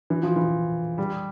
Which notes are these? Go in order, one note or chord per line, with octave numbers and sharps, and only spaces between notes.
E3
F3
E3
G3